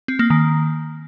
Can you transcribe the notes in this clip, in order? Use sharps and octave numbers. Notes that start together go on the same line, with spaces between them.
C4
A#3
D#3